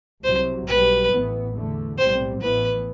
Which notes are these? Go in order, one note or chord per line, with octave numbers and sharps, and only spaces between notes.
C2 C3 F#3 C5
B1 B2 G3 B4
A1 A2 E3 B3
E2 D3 A3
B1 A2 G3 C4 C5
A1 A2 E3 B3 B4